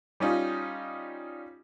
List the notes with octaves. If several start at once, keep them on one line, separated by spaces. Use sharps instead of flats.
G3 C#4 D#4 F4